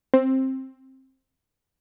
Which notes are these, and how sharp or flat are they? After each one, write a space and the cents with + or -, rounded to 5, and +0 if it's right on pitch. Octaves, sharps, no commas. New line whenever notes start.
C4 +15